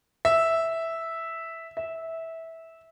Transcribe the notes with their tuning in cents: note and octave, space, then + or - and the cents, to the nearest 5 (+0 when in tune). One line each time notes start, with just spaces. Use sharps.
E5 -5
E5 -15